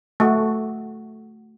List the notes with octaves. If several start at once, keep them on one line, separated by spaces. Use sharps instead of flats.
A3 F#4